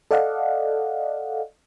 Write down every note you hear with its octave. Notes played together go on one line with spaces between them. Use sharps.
A4 D5 D#5 F5 F#5